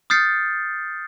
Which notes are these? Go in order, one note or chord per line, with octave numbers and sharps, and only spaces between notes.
D#6 F6 G6 A6 C7 C#7